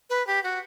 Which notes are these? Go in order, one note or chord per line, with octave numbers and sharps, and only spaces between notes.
B4
G4
F#4